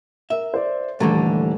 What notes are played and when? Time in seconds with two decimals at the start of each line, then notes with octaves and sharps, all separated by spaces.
0.30 A#4 E5
0.54 C5 D5
1.00 D#1 D3 E3 A3 G4 A#5